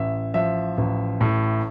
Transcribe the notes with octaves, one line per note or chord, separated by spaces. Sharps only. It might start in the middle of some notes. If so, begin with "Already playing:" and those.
Already playing: A1 E5
F3 E5
A1
A2